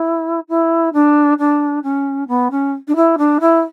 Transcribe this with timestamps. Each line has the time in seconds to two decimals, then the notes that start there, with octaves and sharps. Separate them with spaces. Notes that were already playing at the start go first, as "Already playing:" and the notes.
Already playing: E4
0.49 E4
0.93 D4
1.39 D4
1.84 C#4
2.28 B3
2.51 C#4
2.88 D4
2.96 E4
3.18 D4
3.41 E4